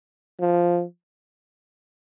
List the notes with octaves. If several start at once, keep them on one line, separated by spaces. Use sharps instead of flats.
F3